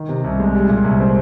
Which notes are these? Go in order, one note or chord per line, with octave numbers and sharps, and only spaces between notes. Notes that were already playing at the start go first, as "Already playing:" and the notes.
Already playing: D#3
C3
C2
G#3
G3
A#2
C2
C4